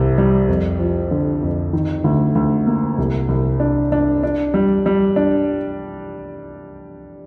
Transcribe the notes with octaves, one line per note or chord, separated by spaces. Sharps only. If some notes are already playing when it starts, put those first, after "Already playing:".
Already playing: C2 C3
G3
F2
F3
D3
F2
D#3
D2
D2
A#3
C2
C2
D4
D4
D4
G3
G3
D4